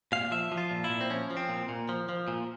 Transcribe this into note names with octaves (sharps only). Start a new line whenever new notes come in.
A#2 F5
F3 E5
F3
F4
A#2
E4
A#2
C4
F3 C#4
F3
C4
A#2
A#2
F3
F3
A#2